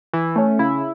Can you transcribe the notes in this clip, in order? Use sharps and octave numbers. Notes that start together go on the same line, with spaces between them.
E3
A3 C#4
C#3 E4